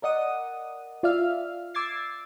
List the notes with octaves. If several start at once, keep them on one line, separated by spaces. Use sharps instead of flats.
A#4 D5 D#5 F#5 D#6
F4 D5 E5 F5 F6
D6 E6 G#6 A6 C7